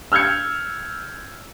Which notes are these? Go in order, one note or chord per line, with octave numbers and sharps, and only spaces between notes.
E6 F6 G6 G#6 C#7